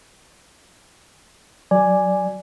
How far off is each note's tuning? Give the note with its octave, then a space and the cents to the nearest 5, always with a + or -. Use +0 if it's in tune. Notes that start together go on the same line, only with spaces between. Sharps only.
F#3 +0 D5 +0 G#5 +0